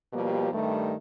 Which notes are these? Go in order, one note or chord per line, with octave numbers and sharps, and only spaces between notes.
B2 F3 G3 A#3 G4
G2 D#3 G3 A3